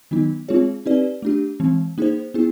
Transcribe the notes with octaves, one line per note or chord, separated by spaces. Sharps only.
D#3 F#3 B3 D#4
G#3 C4 F4 G#4 C#5
C4 D#4 G4 B4 D5
A3 D4 G4
E3 G#3 C4
A#3 D#4 G#4 C5
B3 E4 G#4